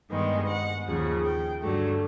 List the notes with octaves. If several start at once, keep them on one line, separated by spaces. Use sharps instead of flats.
G2 D#3 G#3 B3
F#5
D#2 C#3 F3
G5
G2 D3 F#3 A3